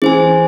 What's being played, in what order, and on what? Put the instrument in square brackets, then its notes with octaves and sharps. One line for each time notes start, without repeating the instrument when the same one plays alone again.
[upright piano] E3 [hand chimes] G#4 C5 G#5